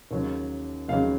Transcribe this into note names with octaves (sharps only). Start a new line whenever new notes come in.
D#2 C#3 F#3
D#2 C#3 F#3 F5